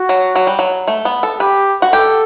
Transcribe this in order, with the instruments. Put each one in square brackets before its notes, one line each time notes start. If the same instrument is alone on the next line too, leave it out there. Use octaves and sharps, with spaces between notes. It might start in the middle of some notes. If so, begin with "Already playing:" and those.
Already playing: [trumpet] F#4
[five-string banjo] F#3
F#3
G3
F#3
A3
B3
A4
[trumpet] G4 [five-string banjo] B4
[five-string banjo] F#4
[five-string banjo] G4 [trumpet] A4